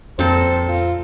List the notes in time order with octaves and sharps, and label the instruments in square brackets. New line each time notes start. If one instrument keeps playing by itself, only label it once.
[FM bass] F2 [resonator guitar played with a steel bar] A#2 C4 A4 [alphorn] C5
[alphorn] F4